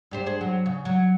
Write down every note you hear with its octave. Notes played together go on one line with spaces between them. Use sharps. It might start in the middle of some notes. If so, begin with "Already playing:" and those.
G2 G4 C5
G#4 C5
F#3
C#3
F#3